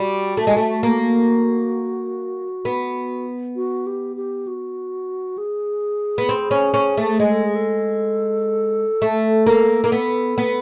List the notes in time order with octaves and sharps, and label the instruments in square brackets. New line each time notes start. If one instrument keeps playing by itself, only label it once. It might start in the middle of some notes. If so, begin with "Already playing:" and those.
Already playing: [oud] G3 [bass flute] F#4
[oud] A3
G#3
A3
A#3
B3
[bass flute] F#4
G4
G4
F#4
G#4
[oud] B3
C4
C#4
C#4
A3
G#3
[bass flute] A4
G#4
A4
[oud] A3
A#3
A#3
B3
B3